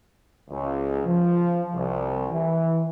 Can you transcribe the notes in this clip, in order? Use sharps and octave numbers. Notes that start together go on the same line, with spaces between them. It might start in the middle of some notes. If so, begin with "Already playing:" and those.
C#2
F3
C2
E3